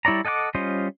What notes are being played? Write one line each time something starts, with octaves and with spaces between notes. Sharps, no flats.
G3 E4 C#5 D5 A#5
A4 D#5 F#5 G5 D6
G3 C#4 F4 C5 D#5